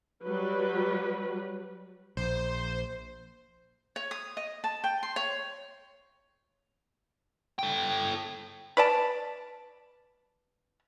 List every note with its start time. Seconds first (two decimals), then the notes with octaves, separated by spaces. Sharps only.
0.24 F#3 G3 B4
2.17 A#1 C5
3.96 C#5
4.11 D#6
4.37 D#5
4.64 A5
4.84 G5
5.03 C6
5.16 C#5
7.59 A4 G5
8.77 B4 D5 A5